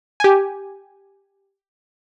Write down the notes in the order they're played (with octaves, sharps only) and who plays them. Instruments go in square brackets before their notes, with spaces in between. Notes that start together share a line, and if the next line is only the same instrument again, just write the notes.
[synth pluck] G4 G#5